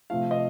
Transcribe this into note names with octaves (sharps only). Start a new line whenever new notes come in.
C3 F3 A3 F5
D#5